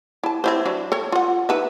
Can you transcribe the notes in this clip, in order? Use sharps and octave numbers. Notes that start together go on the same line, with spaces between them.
E4 A5
C4 E4 C5
F#3 D4 B5
A4 C#5
F4 F#5
D#4 B4 E5